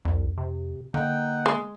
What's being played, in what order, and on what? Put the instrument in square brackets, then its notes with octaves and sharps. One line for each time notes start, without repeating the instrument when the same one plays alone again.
[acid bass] C2 [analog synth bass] F2
[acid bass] C3
[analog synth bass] D3 [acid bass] A#3 [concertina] D#4 F#5 G5
[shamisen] G#3